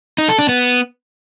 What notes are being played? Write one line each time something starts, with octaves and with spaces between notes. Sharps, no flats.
D#4
A4
D4
B3